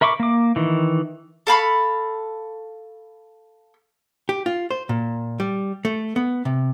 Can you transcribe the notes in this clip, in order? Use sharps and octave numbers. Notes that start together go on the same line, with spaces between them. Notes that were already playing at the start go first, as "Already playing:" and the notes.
A#4 E5 B5 C#6 D6
A#3 D6
D#3 E3
A4 F5 B5 C#6
G4
F4
C5
A#2
G3
A3
B3
C3